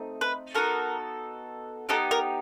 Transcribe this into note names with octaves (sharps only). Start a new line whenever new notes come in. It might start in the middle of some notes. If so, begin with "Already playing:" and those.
Already playing: A3 C4 D#4
B4
B3 D#4 F#4 A4 A#4
B3 D#4 G4 A4
A#4